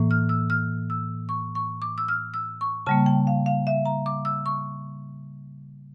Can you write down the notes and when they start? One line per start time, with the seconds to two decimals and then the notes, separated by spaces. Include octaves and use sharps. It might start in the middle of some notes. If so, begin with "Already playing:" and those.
Already playing: A2 E3 A#3
0.11 F6
0.29 E6
0.50 F6
0.90 E6
1.29 C#6
1.55 C#6
1.82 D6
1.98 E6
2.08 F6
2.34 E6
2.61 C#6
2.86 C#3 G3 A#3 A5
3.06 G5
3.27 F5
3.46 F5
3.67 E5
3.85 A#5
4.06 D6
4.25 E6
4.46 C#6